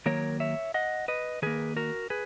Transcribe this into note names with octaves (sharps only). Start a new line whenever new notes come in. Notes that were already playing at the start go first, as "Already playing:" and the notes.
D#3 F#3 A#3 A#4 C#5
C#5 E5
D#5 F#5
B4 D#5
D#3 A#3 G#4 B4
F#4 A#4
G#4 B4